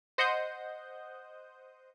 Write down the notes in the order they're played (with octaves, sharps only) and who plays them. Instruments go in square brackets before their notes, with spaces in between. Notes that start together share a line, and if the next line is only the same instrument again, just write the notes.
[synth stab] C5 D#5 F#5 D#6 G6